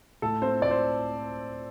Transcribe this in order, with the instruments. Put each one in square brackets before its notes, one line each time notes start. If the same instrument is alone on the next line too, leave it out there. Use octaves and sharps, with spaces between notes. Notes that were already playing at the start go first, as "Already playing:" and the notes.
[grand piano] A2 A4
A3 C4 C5
A2 D5
C5